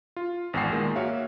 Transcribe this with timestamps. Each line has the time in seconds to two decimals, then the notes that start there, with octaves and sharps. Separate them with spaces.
0.16 F4
0.53 G#1 E2 F#5 G5 C7
0.70 A#2 D#3 G#3 A#3
0.96 A#3 F#4 C#5 E5 F5